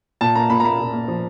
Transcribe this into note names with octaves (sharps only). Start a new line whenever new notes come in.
A#2 A5
A#3 A#5
A#2 B5
A#5
A#3 B5
A#2
A#3
F3